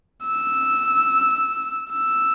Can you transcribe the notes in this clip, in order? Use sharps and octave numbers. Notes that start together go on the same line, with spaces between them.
E6
E6